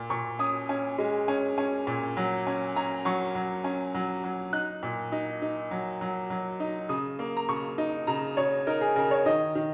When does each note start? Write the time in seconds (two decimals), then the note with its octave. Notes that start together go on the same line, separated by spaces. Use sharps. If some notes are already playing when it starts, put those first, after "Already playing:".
Already playing: A#2
0.10 A#2 C#6
0.39 C#4 D#6
0.69 C#4
0.98 G#3
1.28 C#4
1.58 C#4
1.87 A#2
2.17 F#3
2.47 C#4
2.76 C#4 A#5
3.05 F#3 C#6
3.35 F#3
3.64 C#4
3.95 F#3
4.24 F#3
4.53 D#4 F#6
4.83 A#2
5.12 D#4
5.42 D#4
5.71 F#3
6.01 F#3
6.30 F#3
6.60 D#4
6.89 C#3 D#6
7.19 A#3
7.37 A#5
7.49 C#3 C#6
7.78 D#4
8.07 C#3 A#5
8.37 C#3 C#5
8.67 D#4 A#4
8.81 G#4
8.96 C#3 A#4
9.11 C#5
9.26 D#3 D#5
9.55 D#3